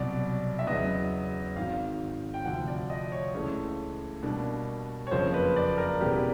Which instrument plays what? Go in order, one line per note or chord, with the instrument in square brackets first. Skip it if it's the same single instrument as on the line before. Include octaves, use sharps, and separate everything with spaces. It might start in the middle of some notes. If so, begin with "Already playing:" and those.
Already playing: [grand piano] C2 B2 F#3 [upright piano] D5
[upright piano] E5
[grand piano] E2 C#3 F#3 B3 [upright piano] D#5
[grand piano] G#1 G#2 D#3 [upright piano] F5
[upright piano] G5
[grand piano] D2 C3 F3 [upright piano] F#5
[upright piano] D5
D#5
C#5
[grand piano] C#2 C#3 E3 A3
B2 G3 A#3 D4
[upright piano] C#5
[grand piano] F#1 F2 C#3 F3 A#3 [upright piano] C5
[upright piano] B4
D5
A#4
[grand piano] E1 E2 C#3 [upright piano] G4